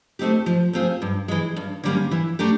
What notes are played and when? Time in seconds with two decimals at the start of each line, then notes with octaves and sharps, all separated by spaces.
0.19 A3 C4 D#4 G4
0.46 F3
0.73 A3 C4 F4 G#4
1.02 G2
1.28 E3 G#3
1.56 G2
1.84 D3 G3 A#3 C#4
2.11 E3
2.39 A3 D4 G4 A#4